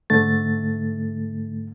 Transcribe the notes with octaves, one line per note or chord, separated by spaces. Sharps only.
G#2 D3 A3 A6